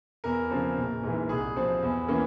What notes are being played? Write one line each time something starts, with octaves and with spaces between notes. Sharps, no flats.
E2 A#4
C#3 F3 C4
A#1
G#2 E3
C2 G#4
C3 F3 C4
E2
E3 A#3 C#4